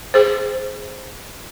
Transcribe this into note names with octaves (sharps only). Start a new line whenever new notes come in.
G#4 C5